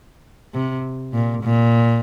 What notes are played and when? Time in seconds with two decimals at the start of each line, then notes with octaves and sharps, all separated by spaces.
0.54 C3
1.13 A#2
1.43 A#2